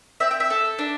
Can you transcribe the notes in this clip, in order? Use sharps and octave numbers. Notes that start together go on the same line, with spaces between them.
C4 E5
G5
E5
A4
D4